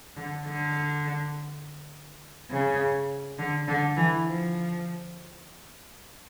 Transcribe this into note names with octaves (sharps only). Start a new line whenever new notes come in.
D3
D3
C#3
D3
D3
E3
F3